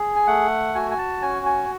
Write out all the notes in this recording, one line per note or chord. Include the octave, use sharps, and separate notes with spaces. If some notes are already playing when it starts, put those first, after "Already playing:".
Already playing: G#4
G#5
A3 F#5
F#4 G#5
G#5
A5
C#4 G#5
G#5